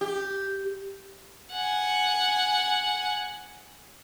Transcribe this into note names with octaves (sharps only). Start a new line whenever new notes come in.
G4
F#5 G#5